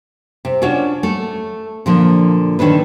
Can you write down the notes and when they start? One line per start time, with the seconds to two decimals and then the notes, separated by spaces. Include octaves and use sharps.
0.45 C3
0.62 C#4 D4 F4 F#4 C#5 D5
1.03 A3
1.86 A#2 D3 F3
2.59 D3 D#3 C#4 D4 B4